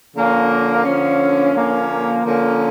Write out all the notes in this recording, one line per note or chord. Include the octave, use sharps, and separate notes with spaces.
D3 F3 A#3 C#4
D3 F3 A#3 C#4
D3 F3 A#3 C#4
D3 F3 A#3 C#4